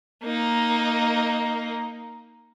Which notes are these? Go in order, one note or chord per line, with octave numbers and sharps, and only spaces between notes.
A#3 D#4